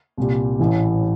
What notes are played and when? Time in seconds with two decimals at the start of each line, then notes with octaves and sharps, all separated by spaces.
0.17 C2 A#2 G3
0.59 A1 A2 E3